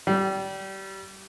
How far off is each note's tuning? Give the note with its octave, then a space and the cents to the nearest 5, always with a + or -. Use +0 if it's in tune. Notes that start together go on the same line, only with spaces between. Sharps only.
G3 -25